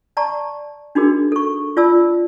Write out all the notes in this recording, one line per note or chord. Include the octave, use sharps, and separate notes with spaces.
D5 A5 A#5 C#6
D4 D#4 F#4 G#4 A#4
A4 C#6
F4 D5 A5 E6